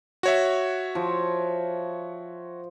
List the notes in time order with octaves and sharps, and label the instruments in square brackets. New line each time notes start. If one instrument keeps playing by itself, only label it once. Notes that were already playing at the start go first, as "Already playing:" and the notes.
[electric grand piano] F#4 C#5 E5
[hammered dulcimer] F3